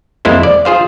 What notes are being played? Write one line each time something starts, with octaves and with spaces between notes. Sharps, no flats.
F2 G#3 A#3 E4 C5
D5
F4 G#4 C5 F5